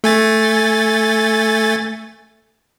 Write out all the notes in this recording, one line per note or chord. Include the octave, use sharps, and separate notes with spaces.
A3 G#5 A6